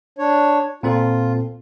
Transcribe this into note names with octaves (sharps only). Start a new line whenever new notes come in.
D4 C#5
A#2 C4 F4 A4